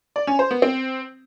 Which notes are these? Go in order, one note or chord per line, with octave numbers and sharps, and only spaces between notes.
D5
C#4
C5
B3
C4